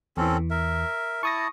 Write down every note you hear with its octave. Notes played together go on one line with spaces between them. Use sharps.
E2 E3 C4 C#4 A4
A#4 E5
E4 A5 C#6 D#6 A#6